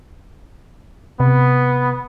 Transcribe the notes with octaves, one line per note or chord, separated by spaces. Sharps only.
C3 B3